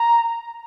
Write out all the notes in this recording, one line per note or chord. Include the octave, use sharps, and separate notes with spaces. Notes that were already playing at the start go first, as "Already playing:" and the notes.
Already playing: A#5